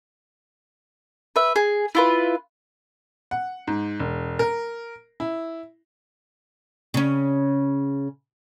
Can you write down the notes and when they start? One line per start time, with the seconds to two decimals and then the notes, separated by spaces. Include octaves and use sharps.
1.36 B4 E5
1.56 G#4
1.95 E4 F4 B4
3.31 F#5
3.67 G#2
4.00 E1
4.39 A#4
5.20 E4
6.94 C#3 C#4